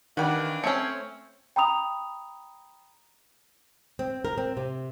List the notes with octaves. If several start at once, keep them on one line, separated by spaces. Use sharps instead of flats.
C3 D#3 E3 A#3 D4 G4 F#5
A3 C4 C#4 C#5 C#7
G5 A#5 B5 D#6 F7
C4
A#4
C4
C3